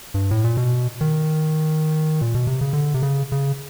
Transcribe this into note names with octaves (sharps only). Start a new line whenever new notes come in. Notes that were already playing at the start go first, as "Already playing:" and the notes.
G2
A2
A#2
B2
D#3
A#2
B2
C3
C#3
D3
C3
C#3
C#3